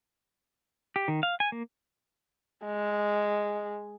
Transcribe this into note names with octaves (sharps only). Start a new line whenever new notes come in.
G4
D#3
F5
G#5
A#3
G#3